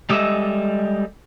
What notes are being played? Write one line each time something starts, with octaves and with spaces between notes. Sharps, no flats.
G3 G#3 G4 A4 D#5 E5